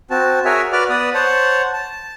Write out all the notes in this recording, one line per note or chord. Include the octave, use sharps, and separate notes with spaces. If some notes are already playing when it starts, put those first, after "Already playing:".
C4 F#4 A5
F#4 G#4 A#4 C#5 E5 G#5
F#4 B4 D5 D6 F6
B3 B4 D5 D#6
C5 C#5 F#5 A5
A5